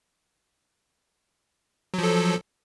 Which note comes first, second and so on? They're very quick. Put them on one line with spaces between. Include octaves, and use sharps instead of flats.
F#3 F3 A4